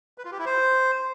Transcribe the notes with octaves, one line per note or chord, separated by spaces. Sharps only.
B4
F4
G4
E4
C5